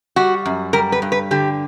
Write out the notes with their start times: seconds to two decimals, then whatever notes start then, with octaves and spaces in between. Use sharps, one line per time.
0.16 G3 F#4
0.46 F#2
0.73 G3 A#4
0.92 B4
1.02 G2
1.12 B4
1.31 D3 G4